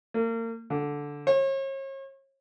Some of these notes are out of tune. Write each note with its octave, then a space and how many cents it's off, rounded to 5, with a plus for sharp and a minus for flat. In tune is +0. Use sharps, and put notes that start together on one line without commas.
A#3 -35
D3 -10
C#5 -40